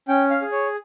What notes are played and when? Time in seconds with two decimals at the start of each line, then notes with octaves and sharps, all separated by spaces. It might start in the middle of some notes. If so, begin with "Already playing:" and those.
0.08 C#4 G5
0.31 F5
0.42 G#4
0.52 C#5